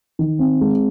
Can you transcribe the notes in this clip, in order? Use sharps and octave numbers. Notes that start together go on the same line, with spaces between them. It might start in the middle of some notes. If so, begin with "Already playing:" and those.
D#3
C4
G#3